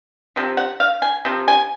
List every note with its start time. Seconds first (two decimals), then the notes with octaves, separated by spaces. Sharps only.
0.36 C3 F3
0.57 F#5
0.80 F5
1.02 G#5
1.25 C3 F3
1.48 G#5